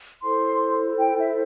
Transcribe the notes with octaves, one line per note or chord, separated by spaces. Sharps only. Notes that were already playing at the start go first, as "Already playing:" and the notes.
E4 A4 C5 C6
G5
E5